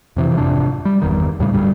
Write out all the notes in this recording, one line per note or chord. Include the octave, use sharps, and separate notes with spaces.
F2 C3 E3
G#1 F2 C3 D4
G3
G1 E2 D#3
D#2 A2 C#3 G3
G1 D2 G3